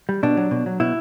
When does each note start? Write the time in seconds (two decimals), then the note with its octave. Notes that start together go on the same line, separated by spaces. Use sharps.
0.09 G3
0.23 B2 D4
0.37 F#3
0.51 B2
0.66 F#3
0.80 B2 E4